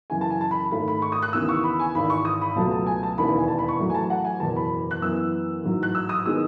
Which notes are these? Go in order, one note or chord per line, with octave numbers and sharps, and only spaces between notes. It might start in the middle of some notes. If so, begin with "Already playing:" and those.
F#2 C#3 E3 G#5
A5
G#5
A5
B5
G#1 G#2 D#3 A3 B5
B5
C#6
D#6
F#6
D#2 C#3 E3 B3 E6
C#6
B5
G#5
G#1 G#2 E3 B5
C#6
D#6
B5
C#2 B2 F#3 A3 A5
A5
G#5
A5
E1 D#2 C#3 E3 B3 B5
G#5
A5
B5
C#6
A1 A2 F#3 A3
G#5
A5
F#5
G#5
F#1 E2 B2 A5
B5
F#6
F#2 E3 B3 E6
A1 G#2 F#3
F#6
E6
D#6
D#3 G#3 B3 E6